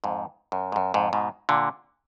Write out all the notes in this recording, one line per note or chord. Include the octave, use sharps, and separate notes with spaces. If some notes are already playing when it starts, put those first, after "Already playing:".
F2 G#2
F#2
G#2
F#2
F2 G#2
G#2 B2
A#2 D3